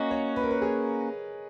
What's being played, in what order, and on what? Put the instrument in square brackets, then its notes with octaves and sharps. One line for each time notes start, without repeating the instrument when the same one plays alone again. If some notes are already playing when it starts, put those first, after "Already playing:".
Already playing: [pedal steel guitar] A#3 C#4 F#4 [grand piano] D#5
[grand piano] C#5
B4
A#4
B4
G#4